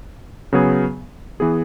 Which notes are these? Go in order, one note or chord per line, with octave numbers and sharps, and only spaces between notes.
C#3 F#3 B3 G#4
E3 B3 G#4